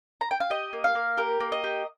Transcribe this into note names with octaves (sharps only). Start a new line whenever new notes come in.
A#5
G5
F5
G4 D#5
A#3
F5
A#3
G4 A#4
A#3
D#5
G4